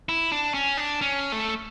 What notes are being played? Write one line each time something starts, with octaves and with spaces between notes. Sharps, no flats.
E4
D4
C#4
D4
C#4
A3